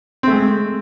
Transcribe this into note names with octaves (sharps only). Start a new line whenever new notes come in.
G#3 A3 C4